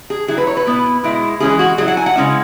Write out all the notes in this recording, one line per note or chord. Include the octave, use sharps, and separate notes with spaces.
G#4
F#3 E4 G#4
B4
C#5
B4
B2 B3 E4
B2 G#3 E4
E3 G#3 C#4 E4 G#4
F#4
F#3 E4 G#4
F#5
G#5
F#5
C#3 G#3 C#4 E4